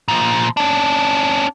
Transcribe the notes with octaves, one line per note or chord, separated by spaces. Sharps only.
A#2 F3
C#4 D4